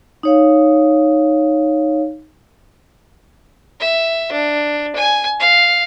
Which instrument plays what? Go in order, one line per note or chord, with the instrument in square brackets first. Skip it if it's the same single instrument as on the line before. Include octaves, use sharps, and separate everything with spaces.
[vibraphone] D#4 C#5 F5
[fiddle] E5
D4
G#5
F5